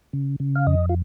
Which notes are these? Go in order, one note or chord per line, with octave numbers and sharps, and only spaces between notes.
C#3
C#3
F5
F2 D#5
F4